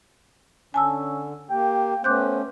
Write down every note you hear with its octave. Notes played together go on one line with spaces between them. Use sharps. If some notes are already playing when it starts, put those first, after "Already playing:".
D3 C#4 G#5 A5 E6
A#3 G4 G5
A3 B3 C#4 C5 D6 F#6 G6